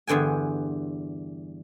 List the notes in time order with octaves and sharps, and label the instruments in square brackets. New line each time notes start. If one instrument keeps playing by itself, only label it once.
[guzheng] E2 G2 D3 G5 G#5